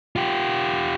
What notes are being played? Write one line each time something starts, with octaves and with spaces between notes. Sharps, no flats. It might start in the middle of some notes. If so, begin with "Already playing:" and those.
F4 G4